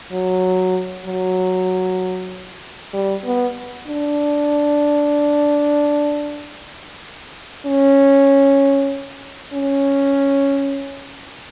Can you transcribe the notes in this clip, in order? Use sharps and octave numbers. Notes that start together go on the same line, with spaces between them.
F#3
F#3
G3
B3
D4
C#4
C#4